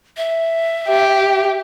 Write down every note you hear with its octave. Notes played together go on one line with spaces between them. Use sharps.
E5
G4